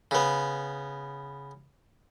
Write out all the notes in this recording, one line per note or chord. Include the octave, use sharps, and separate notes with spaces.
C#3 B3